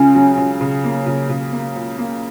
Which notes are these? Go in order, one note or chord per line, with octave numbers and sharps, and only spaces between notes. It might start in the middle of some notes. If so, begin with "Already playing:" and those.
Already playing: C#2 C#3 C#4
F#3
C#2
C#3
A#3
C#3
C#3
A#3
C#2
A#3